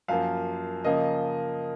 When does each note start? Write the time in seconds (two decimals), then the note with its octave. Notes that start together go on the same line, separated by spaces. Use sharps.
0.08 F#2 F3 A#3 F5
0.84 C#3 F3 A#3 D#5